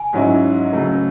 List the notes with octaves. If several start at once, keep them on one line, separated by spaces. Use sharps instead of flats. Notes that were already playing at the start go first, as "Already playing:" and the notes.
Already playing: G#5
G#2 F#3 C#4 E4
C#3 F#3 A3